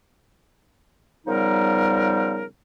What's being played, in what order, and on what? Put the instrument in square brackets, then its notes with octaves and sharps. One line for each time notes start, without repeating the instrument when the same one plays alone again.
[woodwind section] C#3 F3 G3 B3 D#4 A#4